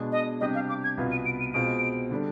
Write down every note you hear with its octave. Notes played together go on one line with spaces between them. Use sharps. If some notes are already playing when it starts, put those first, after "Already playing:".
Already playing: B2 G#3 D4
D#5
C3 G3 D4 G4 D#5
F5
D6
G#6
C2 B2 B3 F4
D#7
D7
D#7
B2 G#3 C4 F4 D7
D3 G3 D4